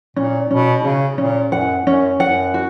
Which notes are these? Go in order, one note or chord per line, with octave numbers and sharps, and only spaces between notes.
A#2 C#4
B2 C#4
C#3 C#4
A#2 C#4
F#2 F#5
F#2 C#4
F#2 F#5
F#4